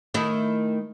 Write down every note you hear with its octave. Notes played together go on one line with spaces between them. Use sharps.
D#3 A3 E4